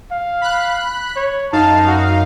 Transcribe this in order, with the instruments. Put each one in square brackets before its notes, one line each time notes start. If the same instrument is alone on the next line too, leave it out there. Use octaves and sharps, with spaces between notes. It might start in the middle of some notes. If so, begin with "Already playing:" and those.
[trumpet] F5
[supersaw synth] B5 F#6
[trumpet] C#5
[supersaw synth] F#2 D#4 F5 [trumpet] A5
[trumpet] F#4